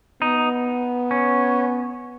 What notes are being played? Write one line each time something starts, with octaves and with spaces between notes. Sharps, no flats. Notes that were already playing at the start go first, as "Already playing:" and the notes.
B3 D#4
C#4